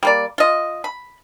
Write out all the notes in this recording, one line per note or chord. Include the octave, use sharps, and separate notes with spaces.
G3 A#3 D5
F4 D#5
B5